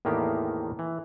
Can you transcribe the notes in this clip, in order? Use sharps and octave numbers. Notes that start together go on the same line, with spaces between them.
E2 A2 D#3 A#3 B3 G4
E3